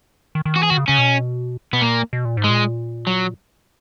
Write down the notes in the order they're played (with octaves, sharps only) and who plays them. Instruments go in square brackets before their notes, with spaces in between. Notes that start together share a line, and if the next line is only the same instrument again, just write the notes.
[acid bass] D#3
D#3
[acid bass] E3 [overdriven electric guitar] F#4
[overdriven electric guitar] G#4
[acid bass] D#3 [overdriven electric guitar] F#4
[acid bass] C#3
[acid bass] C#3 [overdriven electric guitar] C#4
[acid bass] B2
[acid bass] B2 [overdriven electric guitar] B3
[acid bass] A#2 [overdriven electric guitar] A#3
[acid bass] B2
A#2
G#2
[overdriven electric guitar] G#3
[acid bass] A#2
[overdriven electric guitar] F#3